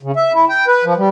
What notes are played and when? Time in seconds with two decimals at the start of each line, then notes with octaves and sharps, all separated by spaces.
0.03 C#3
0.16 E5
0.33 E4
0.49 G5
0.68 B4
0.84 F3
0.97 G3